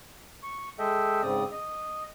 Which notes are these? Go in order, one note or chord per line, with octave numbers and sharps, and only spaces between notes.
C#6
G#3 A4 D#5 E5 G5
G#2 C#3 C4 D5 D#6
D#5